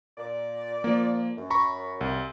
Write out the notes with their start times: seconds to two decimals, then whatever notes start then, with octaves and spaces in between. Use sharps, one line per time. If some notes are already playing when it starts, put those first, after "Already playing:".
0.18 A#2 D5
0.84 F3 A#3
1.37 F#2
1.50 A#5 B5 C#6
2.01 C2